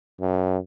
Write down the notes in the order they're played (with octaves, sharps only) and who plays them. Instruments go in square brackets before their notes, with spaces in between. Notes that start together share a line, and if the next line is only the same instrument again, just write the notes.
[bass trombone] F#2